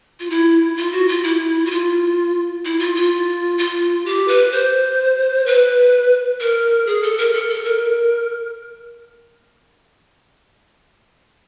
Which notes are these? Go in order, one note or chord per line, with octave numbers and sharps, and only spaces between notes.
F4
E4
F4
F#4
F4
E4
F#4
F4
E4
F4
F4
F4
G4
B4
C5
B4
A#4
G#4
A4
A#4
A4
A4
A#4